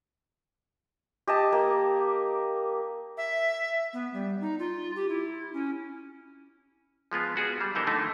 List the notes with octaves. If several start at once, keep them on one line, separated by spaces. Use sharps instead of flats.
G4 D#5 A5
A#3
E5
B3
G3
D#4
F4
G4
E4
C#4
F3 G#3 B3 F4
B3 F#4 G#4 D5
G3
D3 E3 B3 D#4 A#4 C5
D3 F3 A3 D#4 E4